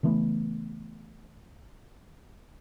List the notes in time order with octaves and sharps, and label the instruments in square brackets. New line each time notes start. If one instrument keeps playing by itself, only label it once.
[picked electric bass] C#3 E3 A3 B3